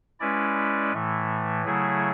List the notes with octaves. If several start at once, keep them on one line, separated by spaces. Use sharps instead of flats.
G#3 C#4 E4 B4 D5
A2 E3 A3
C#3 F#3 A3 E4 G#4